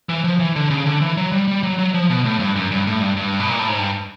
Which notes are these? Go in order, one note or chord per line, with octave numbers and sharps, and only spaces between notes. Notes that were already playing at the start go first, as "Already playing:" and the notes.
E3
F3
E3
D3
C#3
D3
E3
F#3
G3
G3
F#3
F#3
F3
B2
A2
G2
F#2
G2
A2
G2
G2
B2
A#2
A2
G#2
G2